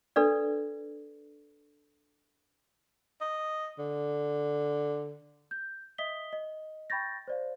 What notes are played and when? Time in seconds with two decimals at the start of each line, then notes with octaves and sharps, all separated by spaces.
0.16 D4 A4 B4 D5
3.21 D#5
3.79 D3
5.51 G6
5.98 D#5 E5 D#6 B6 G7
6.33 D#5
6.90 G5 B5 C#6 G6 A6 A#6
7.28 C5 D5 F5